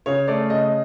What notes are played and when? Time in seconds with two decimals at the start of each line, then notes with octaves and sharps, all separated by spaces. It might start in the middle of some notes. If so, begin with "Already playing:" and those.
0.06 C#3 C#5
0.28 A3 D5
0.50 C#3 D#5